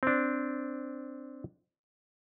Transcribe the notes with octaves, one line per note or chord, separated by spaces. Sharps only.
C4 D4